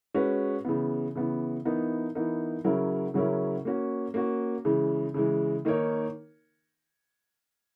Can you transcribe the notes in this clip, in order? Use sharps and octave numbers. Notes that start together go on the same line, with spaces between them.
G#3 C#4 F#4 B4
C#3 E3 B3
C#3 E3 B3
E3 B3 D#4 A#4
E3 B3 D#4 A#4
C#3 F#3 C#4 E4 A#4
C#3 F#3 C#4 E4 A#4
A#3 C#4 F#4
A#3 C#4 F#4
C#3 E3 G#3
C#3 E3 G#3
D#3 A#3 D#4 A#4 C#5